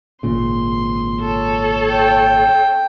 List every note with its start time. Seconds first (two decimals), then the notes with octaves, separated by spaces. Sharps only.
0.23 G#1 A#2 C#3 C6
1.20 A4 C#5
1.90 G5